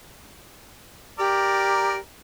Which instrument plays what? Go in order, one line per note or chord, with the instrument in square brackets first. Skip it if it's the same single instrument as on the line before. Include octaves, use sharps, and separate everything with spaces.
[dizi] G4 [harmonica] A#4 D5